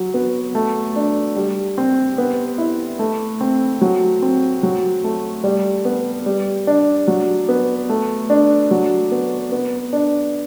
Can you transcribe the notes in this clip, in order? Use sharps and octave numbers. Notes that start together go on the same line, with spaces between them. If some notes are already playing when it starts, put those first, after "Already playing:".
Already playing: F#3
B3
A3
D4
G3
C4
B3
E4
A3
C4
F#3
C4
F#3
A3
G3
B3
G3
D4
F#3
B3
A3
D4
F#3
B3
B3
D4